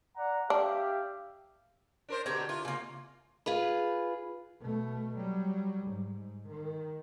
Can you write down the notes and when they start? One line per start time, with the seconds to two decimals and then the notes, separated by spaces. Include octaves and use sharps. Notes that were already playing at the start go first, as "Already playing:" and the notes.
0.17 D5 F#5 A#5
0.50 D4 G4 E5 F5
2.09 D4 A#4 C5
2.26 B2 D3 G4 C#5 A#5
2.49 E4 F4
2.65 C#3 A#3
3.46 F4 G#4 B4
4.60 B2 A3
5.15 F#3 G3
5.86 G#2
6.48 D#3